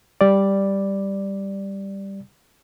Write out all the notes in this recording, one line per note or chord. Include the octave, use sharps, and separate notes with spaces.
G3 D5